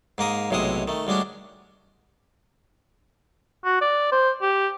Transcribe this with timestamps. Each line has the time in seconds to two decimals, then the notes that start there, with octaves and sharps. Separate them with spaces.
0.18 G#2 A#3 A#4 D#6
0.51 B1 A2 C3 G#3 E4 D#6
0.88 D#3 A3
1.07 D2 G3 G#3 C#4 D4
3.65 F#4
3.81 D5
4.12 C5
4.42 G4